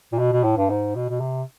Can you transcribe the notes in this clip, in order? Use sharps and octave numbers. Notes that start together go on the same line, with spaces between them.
A#2
B2
B2
A2
G2
G#2
B2
B2
C3